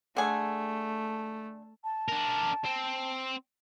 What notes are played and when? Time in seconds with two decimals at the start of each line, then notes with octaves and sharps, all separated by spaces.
0.17 D3 A3 G#4
1.83 A5
2.08 D4 A#4
2.65 C4